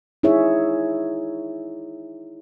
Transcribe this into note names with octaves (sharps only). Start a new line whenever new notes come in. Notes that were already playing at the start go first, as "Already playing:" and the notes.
D#4 E4 G#4 C#5 E5